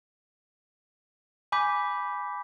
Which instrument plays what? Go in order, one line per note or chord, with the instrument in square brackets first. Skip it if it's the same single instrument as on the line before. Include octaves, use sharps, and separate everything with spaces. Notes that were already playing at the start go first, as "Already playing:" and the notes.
[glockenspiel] G#5 B5 D6 G6 B6